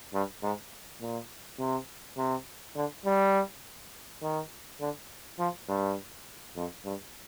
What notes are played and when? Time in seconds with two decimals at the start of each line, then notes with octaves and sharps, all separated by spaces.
0.13 G2
0.43 G#2
1.00 A#2
1.58 C3
2.17 C3
2.76 D3
3.06 G3
4.22 D#3
4.80 D3
5.39 F3
5.68 G2
6.56 F2
6.85 G2